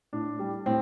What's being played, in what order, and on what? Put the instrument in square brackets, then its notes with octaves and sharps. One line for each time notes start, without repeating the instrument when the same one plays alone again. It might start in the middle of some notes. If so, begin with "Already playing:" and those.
[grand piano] A2 D4
G3
A2 C4